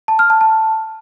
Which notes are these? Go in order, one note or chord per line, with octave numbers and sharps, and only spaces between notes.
A5
F6
A5
A5